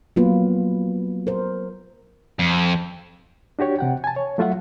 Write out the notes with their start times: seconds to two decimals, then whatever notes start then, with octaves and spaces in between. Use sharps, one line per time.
0.16 F#3 A#3 B3 F4 B4
1.27 A#4 C5
2.39 F2
3.59 D4 F#4 G4 C#5
3.79 C3 F#5 G5
4.04 G#5 A5
4.16 C#5
4.38 F#3 A3 F4 E5 F#5